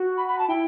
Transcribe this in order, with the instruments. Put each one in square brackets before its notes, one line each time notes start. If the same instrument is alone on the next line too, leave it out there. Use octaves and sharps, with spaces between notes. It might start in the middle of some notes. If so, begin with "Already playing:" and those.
Already playing: [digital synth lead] F#4
[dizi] B5
B5
A5
[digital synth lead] E4 [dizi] G5